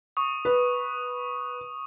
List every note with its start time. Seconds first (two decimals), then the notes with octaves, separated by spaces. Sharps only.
0.17 C#6 D#6
0.45 B4